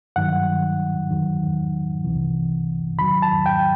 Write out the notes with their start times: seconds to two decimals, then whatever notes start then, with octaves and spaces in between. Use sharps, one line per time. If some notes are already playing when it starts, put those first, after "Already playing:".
0.16 G2 D#3 F#3 F#5
1.10 E2 D#3 F#3
2.04 C2 C3 E3
2.98 E2 D#3 F#3 B5
3.22 A5
3.46 G5